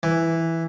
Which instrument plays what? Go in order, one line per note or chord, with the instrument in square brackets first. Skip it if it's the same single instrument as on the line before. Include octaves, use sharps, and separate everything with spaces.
[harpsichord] E3